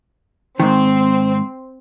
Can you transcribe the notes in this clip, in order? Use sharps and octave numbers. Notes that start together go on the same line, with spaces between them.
G#2 D#3 C4